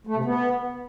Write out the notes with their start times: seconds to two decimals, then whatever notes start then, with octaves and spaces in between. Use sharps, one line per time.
0.07 A3
0.16 C3
0.25 B3